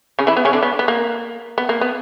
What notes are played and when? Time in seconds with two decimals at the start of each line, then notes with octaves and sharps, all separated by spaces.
0.19 C#3 C#4
0.27 E3 E4
0.37 B3
0.45 C#3 C#4
0.53 D3 D4
0.63 B3
0.79 B3
0.88 A#3
1.58 B3
1.69 A#3
1.81 B3